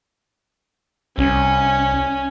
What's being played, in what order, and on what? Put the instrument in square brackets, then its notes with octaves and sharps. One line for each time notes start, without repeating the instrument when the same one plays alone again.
[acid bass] C2 [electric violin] C#4